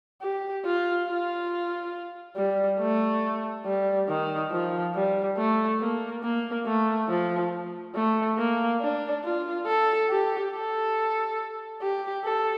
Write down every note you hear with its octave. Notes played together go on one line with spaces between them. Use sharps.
G4
F4
F4
G3
A3
G3
D#3
F3
G3
A3
A#3
A#3
A3
F3
A3
A#3
D4
F4
A4
G4
A4
G4
A4